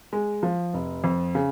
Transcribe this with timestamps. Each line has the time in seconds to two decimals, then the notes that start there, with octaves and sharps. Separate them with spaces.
0.13 G#3
0.43 F3
0.74 F1
1.04 F2
1.35 C#3